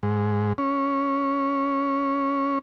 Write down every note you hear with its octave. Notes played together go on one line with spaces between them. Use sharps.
G#2
C#4